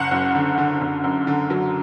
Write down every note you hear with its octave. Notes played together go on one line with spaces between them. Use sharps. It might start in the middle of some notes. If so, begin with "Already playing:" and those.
Already playing: F#1 F#5
F#2
D3
D3
F#1
F#2
D3
F#3